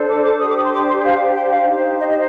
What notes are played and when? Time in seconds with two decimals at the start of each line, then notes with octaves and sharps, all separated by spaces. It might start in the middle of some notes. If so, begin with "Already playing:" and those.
Already playing: D4 A4 C5
0.09 D6
0.24 D6
0.40 D4 G4 C5 D#6
0.48 D6
0.58 D#6
0.64 C6
0.72 D6
0.88 C6
1.04 F5
1.35 G5
1.50 F5
1.66 D#4 G4 C5
1.99 D#5
2.09 D#5